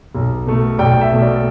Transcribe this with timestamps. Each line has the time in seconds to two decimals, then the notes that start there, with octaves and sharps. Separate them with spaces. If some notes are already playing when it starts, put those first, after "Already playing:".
0.15 B1
0.46 B2 A3
0.79 B1 D5 G5
1.01 E5
1.12 B2 A3
1.22 D5